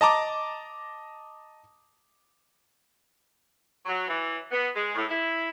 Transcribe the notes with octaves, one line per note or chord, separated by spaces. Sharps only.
D#5 A5 A#5 D6
F#3
E3
B3
G#3
A2
E4